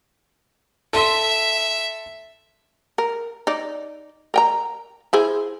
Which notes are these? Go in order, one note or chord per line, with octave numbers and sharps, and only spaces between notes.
A4 E5 C6
A#4
D#4 D5
A#4 G5 A#5
E4 G#4 C5